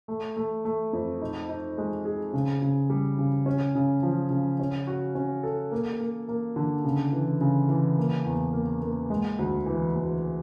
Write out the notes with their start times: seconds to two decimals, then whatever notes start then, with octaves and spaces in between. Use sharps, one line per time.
0.08 A3
0.37 A3
0.65 A3
0.93 F2
1.21 D#4
1.49 D#4
1.78 G#3
2.05 G#4
2.33 C#3
2.62 C#3
2.90 G3
3.18 C#3
3.46 C#4
3.75 C#3
4.03 F3
4.30 C#3
4.59 C#4
4.87 F#4
5.15 C#4
5.43 A4
5.71 A#3
6.01 A#3
6.28 A#3
6.56 D3
6.85 C#3
7.12 E3
7.41 C#3
7.69 E3
7.98 A#3
8.25 E2
8.53 A#3
8.82 A#3
9.10 G#3
9.39 D2
9.66 E3
9.94 D2